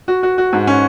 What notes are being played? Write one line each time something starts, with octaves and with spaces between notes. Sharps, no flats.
F#4
F#4
F#4
G#2
C#4